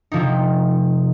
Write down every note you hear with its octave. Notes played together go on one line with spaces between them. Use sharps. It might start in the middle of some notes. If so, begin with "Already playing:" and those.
C3 F3 D#4